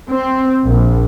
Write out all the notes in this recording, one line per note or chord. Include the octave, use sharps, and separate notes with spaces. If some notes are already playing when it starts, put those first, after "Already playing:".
C4
A#1